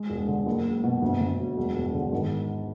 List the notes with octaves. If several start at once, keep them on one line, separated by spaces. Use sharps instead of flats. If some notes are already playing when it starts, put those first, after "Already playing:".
Already playing: G#3
E1
D3
F#1
F#1
B2
D2
D2
F#3
E1
E1
D3
G#1